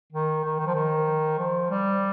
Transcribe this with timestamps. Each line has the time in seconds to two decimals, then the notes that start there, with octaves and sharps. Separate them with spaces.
0.13 D#3
0.44 D#3
0.59 D#3
0.67 F3
0.75 D#3
1.39 F3
1.71 G3